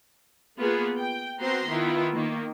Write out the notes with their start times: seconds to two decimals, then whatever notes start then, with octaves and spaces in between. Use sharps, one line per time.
0.59 A#3 B3 F4 G#4
0.98 G5
1.39 B3 C4 F#4 C5 A#5 C6
1.68 D#3 B3 E4 F4
2.14 D#3 A#3